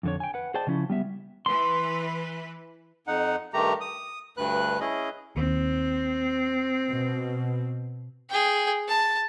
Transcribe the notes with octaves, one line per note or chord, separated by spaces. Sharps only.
F2 D3 C#5
G5 G#5
B4 F#5
G#4 C5 D5 D#5 G5 A5
C#3 F3 C#4 E4
G3 B3 E5
E3 B4 C6
F2 D#4 F#5
G2 D#3 A3 G4 A#5
D#6
D2 G2 B4 F#6
C#4 E4 G#4 D#5
D#2 C4
B2
G#4 G5
A5